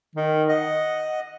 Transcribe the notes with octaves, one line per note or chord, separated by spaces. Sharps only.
D#3
D#5 F#5